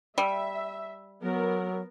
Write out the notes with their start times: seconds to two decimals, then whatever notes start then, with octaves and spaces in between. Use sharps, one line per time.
0.18 G3 E5
1.22 F#3 B3 A#4